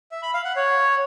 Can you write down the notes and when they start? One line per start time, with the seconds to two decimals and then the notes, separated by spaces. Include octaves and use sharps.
0.11 E5
0.23 B5
0.34 F5
0.45 F#5
0.56 C#5